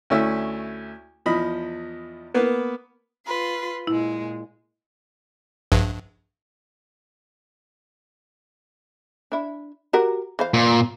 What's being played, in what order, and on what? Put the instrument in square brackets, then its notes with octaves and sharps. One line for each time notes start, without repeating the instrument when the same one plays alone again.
[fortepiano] D2 A3 C#4 E4 E6
E2 F3 D#5 B5
A#3 B3 B4
[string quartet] F4 B4 C6
[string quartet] A#2 G#3 [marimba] E4
[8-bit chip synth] A#1 G2
[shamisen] D4 E4
F#4 G4 A#4
E3 C5 F5
[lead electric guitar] A#2